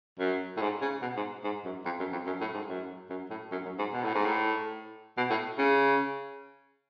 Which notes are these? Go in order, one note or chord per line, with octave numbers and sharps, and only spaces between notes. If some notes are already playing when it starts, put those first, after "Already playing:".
F#2
A2
G#2
C#3
B2
G#2
G#2
F#2
F2
F#2
F2
F#2
A2
G#2
F#2
F#2
A2
F#2
F#2
G#2
B2
A2
G#2
A2
B2
A2
C#3